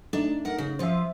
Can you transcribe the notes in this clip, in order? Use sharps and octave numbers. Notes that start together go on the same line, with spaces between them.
A3 D4 D#4
A#4 F#5
C#3
F3 F4 C5 E5